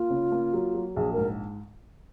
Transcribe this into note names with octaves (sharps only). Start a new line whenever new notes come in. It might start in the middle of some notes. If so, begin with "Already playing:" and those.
Already playing: A#3 F4
C#3
A#3
F#3
F#3
A#1 G#4
G#2 A#4